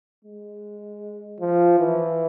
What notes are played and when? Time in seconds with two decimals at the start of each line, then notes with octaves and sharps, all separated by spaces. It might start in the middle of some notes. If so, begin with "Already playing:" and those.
0.25 G#3
1.40 F3
1.79 E3